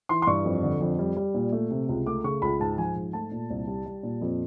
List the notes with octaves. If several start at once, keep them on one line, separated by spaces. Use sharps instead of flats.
E3 C6
C6
G2 C#6
F2
D3
F2
G3
G3
A#2
A3
C3
C#2
A3 D6
C#3 C#6
C#2 B5
G#2 A5
F3 G#5
G#2
A3 A5
A#2
C2
G3
G3
A#2
F2